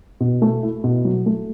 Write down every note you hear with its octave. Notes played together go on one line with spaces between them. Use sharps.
B2
A3
E4
B2
F#3
A3